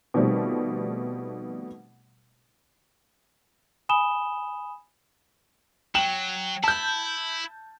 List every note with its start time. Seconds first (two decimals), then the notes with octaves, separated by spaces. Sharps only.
0.14 B2 D#3 F3 G3 A3 C4
3.89 G#5 B5 D#6 E7 G7
5.95 F#3 G5 E7 F#7
6.64 E4 A5 G6